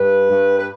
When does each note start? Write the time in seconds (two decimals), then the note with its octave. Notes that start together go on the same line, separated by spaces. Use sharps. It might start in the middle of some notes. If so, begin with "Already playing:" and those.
Already playing: G2 B4
0.30 G2
0.59 B4